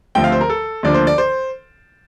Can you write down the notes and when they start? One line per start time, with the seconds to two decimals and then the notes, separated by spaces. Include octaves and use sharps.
0.15 D2 D3 F3 A3 C4 G5
0.24 F5
0.32 C5
0.41 A#4
0.50 A4
0.83 D2 D3 F3 A#3 D4 D5
0.94 C5
1.07 D5
1.18 C5